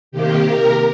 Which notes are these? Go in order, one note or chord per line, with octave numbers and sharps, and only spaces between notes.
C3 D#3 A#3 G4
A#4